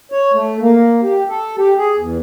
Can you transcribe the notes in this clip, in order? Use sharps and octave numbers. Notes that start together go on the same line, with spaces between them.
C#5
A3
A#3
G4
A4
G4
G#4
E2